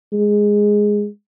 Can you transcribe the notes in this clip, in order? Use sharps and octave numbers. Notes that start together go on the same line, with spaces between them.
G#3